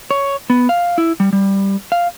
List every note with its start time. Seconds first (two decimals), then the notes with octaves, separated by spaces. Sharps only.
0.11 C#5
0.50 B3
0.69 F5
0.98 E4
1.20 G3
1.33 G3
1.92 F5